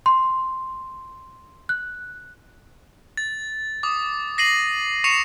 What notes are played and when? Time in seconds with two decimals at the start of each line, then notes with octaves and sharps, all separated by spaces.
0.06 C6
1.69 F#6
3.17 A6
3.83 D6 D#6
4.38 A#6 C7 D#7 F#7
5.04 C#6 C7 C#7 E7 F7